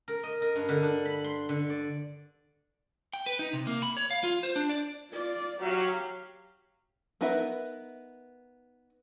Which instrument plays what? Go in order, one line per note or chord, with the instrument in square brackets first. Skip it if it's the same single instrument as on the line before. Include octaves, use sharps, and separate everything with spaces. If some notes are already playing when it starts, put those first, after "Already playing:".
[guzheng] A#4
D#5
A#4
G2
D3
D4
B5
C6
D3
D5
[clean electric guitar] G5
B4
D#4
C3
A#3
B5
C#5
F5
F4
C5
D4
D5
[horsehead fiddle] F4 D5
[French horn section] F#3 [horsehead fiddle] G4 F5
[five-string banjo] B3 D#4 A#4 B4 E5